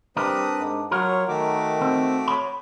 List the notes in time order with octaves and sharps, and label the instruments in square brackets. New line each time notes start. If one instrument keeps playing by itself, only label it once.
[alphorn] G3 [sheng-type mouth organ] C4 B4 D#6 [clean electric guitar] D4 A#4
[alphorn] G#2
[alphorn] F#3 [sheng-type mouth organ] F4 C#5 [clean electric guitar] A#4
[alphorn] D#3 [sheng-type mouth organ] A3 F#4 D6
[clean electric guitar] C4
C#5 B5